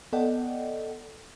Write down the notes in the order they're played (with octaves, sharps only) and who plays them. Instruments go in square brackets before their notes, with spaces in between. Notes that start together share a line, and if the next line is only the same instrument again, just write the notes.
[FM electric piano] B3 A4 D5 D#5 F#5 G5